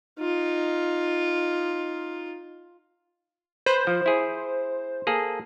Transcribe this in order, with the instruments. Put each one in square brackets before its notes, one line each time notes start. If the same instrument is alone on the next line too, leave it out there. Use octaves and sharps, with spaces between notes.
[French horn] D#4 [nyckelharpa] F4
[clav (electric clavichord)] B4 [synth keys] C5
[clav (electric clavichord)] F3
E4 G#4
A#3 G#4 A4